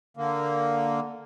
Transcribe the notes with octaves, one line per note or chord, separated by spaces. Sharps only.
D3 A#3